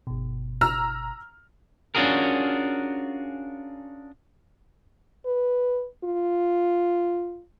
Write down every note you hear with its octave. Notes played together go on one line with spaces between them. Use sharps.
G1 B2
A#5 E6 F6
C#4 D4 F4 F#4 G#4 A#4
B4
F4